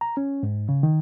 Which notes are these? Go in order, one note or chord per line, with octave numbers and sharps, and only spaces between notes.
A#5
C#4
G#2
C#3
D#3